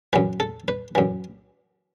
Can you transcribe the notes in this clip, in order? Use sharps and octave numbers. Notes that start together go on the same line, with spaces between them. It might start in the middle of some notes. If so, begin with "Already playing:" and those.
F#2 E3 B4
A4
B4
F#2 E3